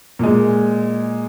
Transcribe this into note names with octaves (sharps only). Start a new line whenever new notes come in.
A#2 G#3